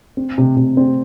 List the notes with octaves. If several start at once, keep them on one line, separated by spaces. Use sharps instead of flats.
C4
C3
C3
C4